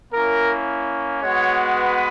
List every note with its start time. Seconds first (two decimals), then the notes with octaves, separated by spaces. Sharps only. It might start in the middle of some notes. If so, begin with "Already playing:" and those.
0.13 A#3 C#4 E4 A#4
1.22 G#3 B3 F#4 C#5
1.77 B4